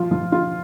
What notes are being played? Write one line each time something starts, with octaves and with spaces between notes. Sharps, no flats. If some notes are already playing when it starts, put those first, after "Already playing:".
Already playing: F3 F4
F3
F4